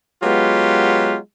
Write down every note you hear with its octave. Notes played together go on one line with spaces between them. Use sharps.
F#3 G#3 B3 F4 G4